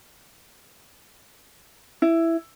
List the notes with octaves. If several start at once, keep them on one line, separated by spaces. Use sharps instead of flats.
E4